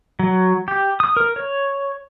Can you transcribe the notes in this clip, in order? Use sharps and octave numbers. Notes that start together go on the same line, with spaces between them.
F#3
G4
D#6
A#4
C#5